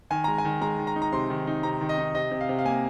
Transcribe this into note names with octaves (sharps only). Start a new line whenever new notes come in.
D#3 G#5
G#3 A#5
G#5
D#3
G#3 A#5
D#3
A#5
D#4
A#5
C3 C6
D#3
D#4
C3 A#5
D#3
D#5
D#4
C3 D#5
C3
F5
C3
F5
A#3 G#5